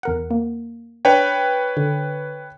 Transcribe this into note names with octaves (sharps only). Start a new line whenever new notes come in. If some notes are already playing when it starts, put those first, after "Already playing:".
E2 A#4 F#5
A#3
D4 B4 C#5 G5
D3